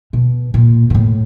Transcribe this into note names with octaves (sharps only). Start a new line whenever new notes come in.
B2
A#2
A#2
A2